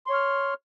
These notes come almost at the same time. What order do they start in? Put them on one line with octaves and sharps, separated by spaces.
C6 C#5 F6